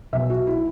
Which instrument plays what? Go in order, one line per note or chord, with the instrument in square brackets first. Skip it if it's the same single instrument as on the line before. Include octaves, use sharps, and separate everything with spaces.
[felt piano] B1 B2 E5
F#4
E4